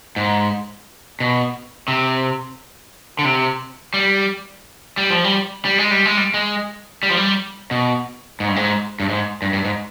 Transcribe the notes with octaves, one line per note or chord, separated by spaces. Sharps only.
G#2
B2
C3
D3
C3
G3
G3
F3
G3
G3
G#3
G3
G#3
G3
G#3
G3
F3
G3
B2
G#2
G2
G#2
G2
G#2
G2
G2
G#2